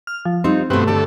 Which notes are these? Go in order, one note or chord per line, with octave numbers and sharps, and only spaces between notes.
F6
F3
G3 C4 D#4 F4
G2 B2 A3 B3 C4 F#4
D3 A3 G4 A4 D5